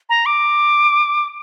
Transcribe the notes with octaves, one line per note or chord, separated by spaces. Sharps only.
A#5
D6